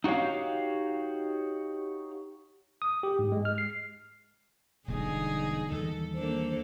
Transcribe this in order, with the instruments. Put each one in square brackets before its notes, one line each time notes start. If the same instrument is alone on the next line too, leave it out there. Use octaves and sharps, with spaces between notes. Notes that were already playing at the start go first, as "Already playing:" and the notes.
[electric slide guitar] D#4 F#4 G4 C#5 F5
[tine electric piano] D#6
G4
G#2
G#3
F6
C7
[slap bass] E1 B2 G3 [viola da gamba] D3 D#4 G#4
[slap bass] D#2 E3 G3 [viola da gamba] A4
[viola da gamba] A#3 D4 A4 [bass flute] C5